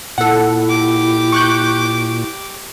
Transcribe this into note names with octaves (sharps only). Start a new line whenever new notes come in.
A#2 E4 A4 F#5
G4 D6
C#6 F#6 G6